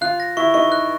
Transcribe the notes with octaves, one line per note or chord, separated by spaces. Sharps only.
F4 F5 F#6
A#6
E4 E5 C#6
D#4 D#5 C#6
F#6